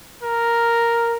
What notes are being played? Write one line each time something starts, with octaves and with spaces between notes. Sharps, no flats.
A#4